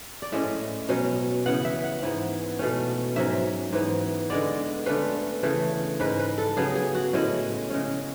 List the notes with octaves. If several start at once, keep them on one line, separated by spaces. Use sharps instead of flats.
D5
A2 G#3 C#4 E5
B2 F#3 C#4
C#3 E3 B3 F#5
E5
F#5
G#2 E3 B3
B2 A3 C#4
G#2 F#3 C#4 E5
G#2 E3 B3
D3 G#3 B3 D5
D3 A3 C#4 B4
C#3 E3 A3
G#2 G#3 C#4 B4
B4
A4
C#3 F#3 B3 G#4
G#4
F#4
A2 G#3 C#4 E4
C#3 G#3 C#4